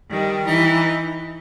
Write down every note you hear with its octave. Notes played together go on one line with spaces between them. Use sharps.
D#3 G3
E3 D#4